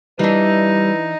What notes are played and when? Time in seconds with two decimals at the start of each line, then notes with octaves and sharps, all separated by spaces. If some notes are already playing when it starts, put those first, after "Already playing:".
0.19 E3 G3 D4 D#4 B4